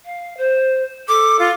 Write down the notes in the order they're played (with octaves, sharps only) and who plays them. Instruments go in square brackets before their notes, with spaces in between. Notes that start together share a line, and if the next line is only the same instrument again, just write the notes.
[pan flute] F5
C5
[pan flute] A4 [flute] D6
[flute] F4